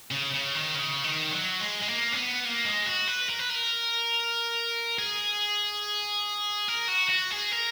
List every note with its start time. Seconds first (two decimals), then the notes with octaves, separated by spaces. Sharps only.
0.12 C#3
0.34 C#3
0.55 D#3
0.75 C#3
1.04 D#3
1.32 F#3
1.60 G#3
1.82 G#3
1.88 A#3
2.12 C#4
2.16 B3
2.45 A#3
2.65 G#3
2.86 F#4
3.08 B4
3.29 A#4
3.40 B4
3.50 A#4
4.99 G#4
6.68 A#4
6.88 F#4
7.10 F#4
7.31 G#4
7.52 A#4